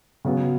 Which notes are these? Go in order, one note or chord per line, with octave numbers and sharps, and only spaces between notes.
C#3 F#3 B3 F#4